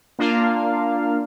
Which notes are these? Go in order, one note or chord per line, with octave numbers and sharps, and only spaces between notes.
A#3 D4 F4 F5